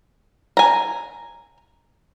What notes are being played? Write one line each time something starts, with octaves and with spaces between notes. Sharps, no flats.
G#5 A#5